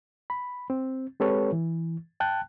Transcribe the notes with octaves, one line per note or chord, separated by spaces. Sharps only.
B5
C4
G#3 C4 G4 A4 B4 C#5
E3
G5 A5 F#6